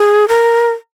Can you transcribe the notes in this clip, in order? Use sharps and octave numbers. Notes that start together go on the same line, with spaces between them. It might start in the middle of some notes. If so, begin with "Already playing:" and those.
Already playing: G#4
A#4